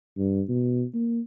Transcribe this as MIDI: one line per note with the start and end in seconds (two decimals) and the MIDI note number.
0.18 0.42 43
0.49 0.84 47
0.94 1.20 58